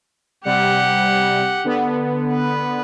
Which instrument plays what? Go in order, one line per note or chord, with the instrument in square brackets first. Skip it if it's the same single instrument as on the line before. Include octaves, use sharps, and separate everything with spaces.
[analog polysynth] C3 G3 [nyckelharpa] G4 F#5
[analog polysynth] D3 B3
[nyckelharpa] B4